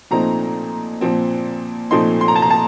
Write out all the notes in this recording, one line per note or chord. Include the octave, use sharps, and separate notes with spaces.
A#2 F3 A3 C4 D#4 A#5
A#2 F3 C4
A#2 F3 A3 C4 D#4 C6
C6
A#5
A5
A#5
A5